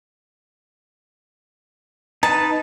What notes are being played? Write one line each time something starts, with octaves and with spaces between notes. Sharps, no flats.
D#4 B4 A5